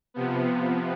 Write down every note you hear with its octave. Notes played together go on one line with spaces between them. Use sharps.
C3 F3 B3